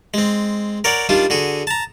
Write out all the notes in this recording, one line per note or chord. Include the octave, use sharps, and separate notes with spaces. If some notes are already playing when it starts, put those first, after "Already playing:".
G#3 C4
A#4 C#5 D5 F#5
D#3 G3 D4 F4
D3 F#4 G#4
A5 A#5